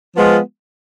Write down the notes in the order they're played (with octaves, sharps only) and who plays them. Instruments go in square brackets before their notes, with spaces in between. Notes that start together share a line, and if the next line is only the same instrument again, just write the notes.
[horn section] F3 G#3 B3 F4